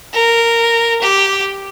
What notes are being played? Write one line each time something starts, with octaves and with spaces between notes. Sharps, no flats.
A#4
G4